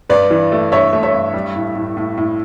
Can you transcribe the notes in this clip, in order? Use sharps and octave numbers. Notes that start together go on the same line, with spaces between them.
G2 B4 D5
E3
A3
G2 C#5 E5
A3
C#5 E5
G2
G3
A2
A2
A2
A2